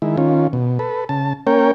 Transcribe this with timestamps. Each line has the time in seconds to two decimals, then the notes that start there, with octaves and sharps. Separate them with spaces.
0.02 D#3 G#3 E4
0.17 D#3 C#4 F4
0.53 B2
0.79 A4 B4
1.09 C#3 A5
1.47 A#3 C#4 A#4 C#5 G5